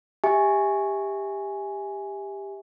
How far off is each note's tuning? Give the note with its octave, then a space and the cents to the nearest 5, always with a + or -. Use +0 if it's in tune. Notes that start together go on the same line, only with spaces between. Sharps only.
G4 +15 E5 -20 G#5 +0